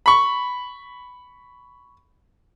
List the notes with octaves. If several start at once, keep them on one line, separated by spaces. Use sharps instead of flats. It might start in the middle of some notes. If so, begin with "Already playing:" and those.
B5 C#6